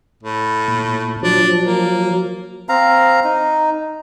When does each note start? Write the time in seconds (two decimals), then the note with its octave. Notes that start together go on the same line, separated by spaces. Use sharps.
0.23 A2
0.68 A#2
1.23 F3 F#3 D4
1.66 A#3
2.69 C4 F5 A#5
3.24 D#4